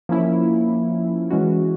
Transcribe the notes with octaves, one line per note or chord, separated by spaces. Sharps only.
F3 A#3 C#4 E4
E3 G#3 C#4 F#4